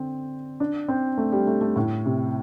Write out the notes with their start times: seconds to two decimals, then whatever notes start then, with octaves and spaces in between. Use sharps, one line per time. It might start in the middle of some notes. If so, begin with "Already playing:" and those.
Already playing: D3 C4
0.60 D4
0.88 C4
1.18 A3
1.32 G3
1.47 A3
1.61 A3
1.76 A2
2.06 C3